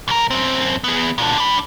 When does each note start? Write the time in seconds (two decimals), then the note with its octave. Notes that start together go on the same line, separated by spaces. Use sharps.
0.08 B1 A#4
0.31 F#2 C4
0.84 B3 G#4
1.18 A#2 D3
1.38 D4 B5